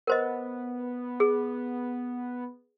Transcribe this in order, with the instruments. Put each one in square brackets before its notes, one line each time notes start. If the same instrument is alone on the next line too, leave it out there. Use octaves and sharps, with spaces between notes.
[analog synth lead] B3 [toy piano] A#4 C5 D#5
[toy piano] G#4